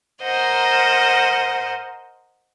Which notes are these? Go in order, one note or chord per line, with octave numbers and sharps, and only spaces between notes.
A#4 C5 D#5 F#5